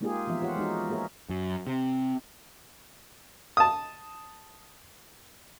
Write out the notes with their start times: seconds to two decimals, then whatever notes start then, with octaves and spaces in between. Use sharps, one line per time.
0.01 G#3 A#3 D#4 F4 G4 G#4
0.27 E3 F3 B3 E5
0.41 F4 G4 C#5 F5 F#5
0.57 G#3 D#4 F#4
0.90 A#3 G#4 A#4 C#5 E5
1.29 F#2
1.67 C3
3.57 A5 D#6